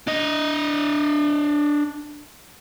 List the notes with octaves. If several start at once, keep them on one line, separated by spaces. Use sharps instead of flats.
D4 D#5